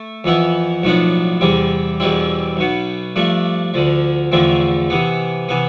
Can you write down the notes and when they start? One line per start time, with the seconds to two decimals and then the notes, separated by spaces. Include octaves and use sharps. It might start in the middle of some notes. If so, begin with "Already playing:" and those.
Already playing: A3
0.24 F2 E3 B3 E4
0.83 B1 A2 F3 B3 D4
1.41 E2 C3 G3 C4
2.00 E2 B2 G3 C4 E4
2.57 B1 B2 B3
3.16 G2 F3 A3 D4
3.74 D2 D3 F3
4.32 E2 D3 F3 A3 C4
4.90 C3 E3 B3
5.49 C3 E3 B3